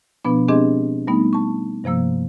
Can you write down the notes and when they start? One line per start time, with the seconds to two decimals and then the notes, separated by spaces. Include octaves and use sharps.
0.25 B2 F3 B3 D4
0.48 G#3 C4 D4 G4 G#4 D#5
1.07 G3 A3 B3 D#4
1.33 A5 C#6
1.84 G2 C3 F3 A#3 E6